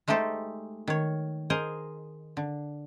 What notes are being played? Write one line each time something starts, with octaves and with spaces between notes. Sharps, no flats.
G#3 A3 D#4 G4 A4 C5
D#3 C#5
G#4 A#4 C5 D#5
D3